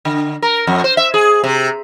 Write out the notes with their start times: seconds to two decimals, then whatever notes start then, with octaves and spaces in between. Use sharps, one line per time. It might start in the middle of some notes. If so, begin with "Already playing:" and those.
0.05 D3
0.42 A#4
0.67 F2
0.84 C5
0.97 E5
1.14 G#4
1.44 C3